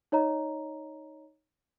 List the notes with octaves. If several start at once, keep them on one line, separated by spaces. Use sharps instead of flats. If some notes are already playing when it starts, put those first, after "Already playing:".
D#4 C#5 D#5 A#5